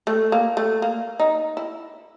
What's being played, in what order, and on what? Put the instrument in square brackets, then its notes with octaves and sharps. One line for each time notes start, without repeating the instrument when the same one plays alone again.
[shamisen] A3
A#3
A3
A#3
D#4
E4